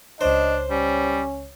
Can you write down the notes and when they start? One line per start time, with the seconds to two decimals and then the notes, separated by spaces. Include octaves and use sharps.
0.21 C#2 D4 C5 C#5 D#5
0.71 G3 C#4